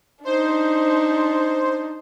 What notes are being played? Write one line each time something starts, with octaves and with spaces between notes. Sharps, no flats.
D4 D#4 C5